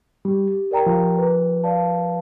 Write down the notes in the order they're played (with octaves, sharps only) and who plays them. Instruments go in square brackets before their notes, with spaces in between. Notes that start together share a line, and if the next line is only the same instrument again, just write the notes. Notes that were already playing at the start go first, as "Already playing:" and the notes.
[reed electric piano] G3 [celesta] G4
[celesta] A#4 D5 G5 A#5
[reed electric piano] F3
[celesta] B4
D5 F5 A5